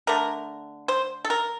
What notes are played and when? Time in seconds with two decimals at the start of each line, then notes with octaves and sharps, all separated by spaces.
0.07 D3 A3 A#4
0.88 C5
1.25 A4
1.30 A#4